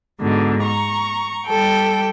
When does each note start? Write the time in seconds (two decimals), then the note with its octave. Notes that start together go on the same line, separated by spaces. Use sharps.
0.20 G#2 B2 D3
0.62 A#5 C#6
1.48 G3 A4 G5